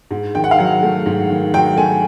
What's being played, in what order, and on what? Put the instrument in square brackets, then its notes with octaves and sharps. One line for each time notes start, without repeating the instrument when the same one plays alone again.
[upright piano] G#2
D#3 G5
F#5
F5
F#3 F#5
A3
G#2
D#3
F#3 G5
A3 G#5